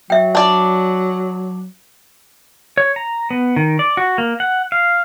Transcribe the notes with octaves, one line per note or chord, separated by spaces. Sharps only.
F#3 E5 G5
D4 D5
C#5
A#5
B3
D#3
D5
F#4
A#3
F#5
F5